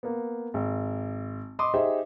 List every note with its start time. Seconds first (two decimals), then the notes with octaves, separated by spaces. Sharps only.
0.03 A#3 B3
0.54 G#1
1.59 D#5 B5 C6 D6 D#6
1.74 D#4 G4 G#4 C5 E5